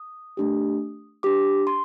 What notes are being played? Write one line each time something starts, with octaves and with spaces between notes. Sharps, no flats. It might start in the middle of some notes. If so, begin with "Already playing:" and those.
Already playing: D#6
A3 D4 G4
D4 G4 D6
C6